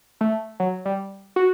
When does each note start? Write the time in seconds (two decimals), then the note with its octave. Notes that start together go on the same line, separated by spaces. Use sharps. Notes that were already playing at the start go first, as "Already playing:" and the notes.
0.21 A3
0.60 F#3
0.85 G3
1.36 F#4